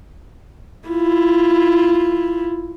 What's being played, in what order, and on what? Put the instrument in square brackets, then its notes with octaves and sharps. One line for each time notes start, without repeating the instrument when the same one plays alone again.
[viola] E4 F4